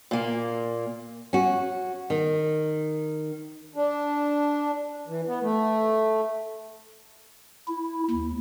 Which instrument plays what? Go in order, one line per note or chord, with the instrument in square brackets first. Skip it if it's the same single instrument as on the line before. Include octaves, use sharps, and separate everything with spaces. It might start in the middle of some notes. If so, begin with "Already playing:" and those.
[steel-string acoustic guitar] A#2 A#3
[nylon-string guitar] C#4 F#4
D#3
[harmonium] D4
E3
B3
A3
[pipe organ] E4
D#2